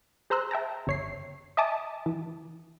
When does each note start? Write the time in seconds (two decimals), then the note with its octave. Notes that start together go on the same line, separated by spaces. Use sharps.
0.30 G#4 C5 A#5 C6 E6 F#6
0.51 E5 G5 A5 A#5
0.87 G1 C#5 C7
1.57 D#5 E5 G#5 A5 D6 D#6
2.06 E3